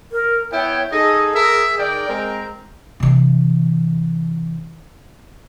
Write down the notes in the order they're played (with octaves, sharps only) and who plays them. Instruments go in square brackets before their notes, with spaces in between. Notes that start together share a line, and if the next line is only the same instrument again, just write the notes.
[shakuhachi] A#4
[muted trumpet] B3 [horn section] E4 G5 [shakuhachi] C#5
[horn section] D#4 A4 [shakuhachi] G#4 [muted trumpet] D#5
[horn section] A#4 [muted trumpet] E5
[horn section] D#3 A#4 D5 [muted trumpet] G5
[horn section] G#3 C4 A#4
[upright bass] C3 E3